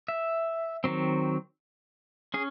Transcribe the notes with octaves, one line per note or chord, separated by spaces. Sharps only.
E5
D#3 F#3 C4
C#4 G#4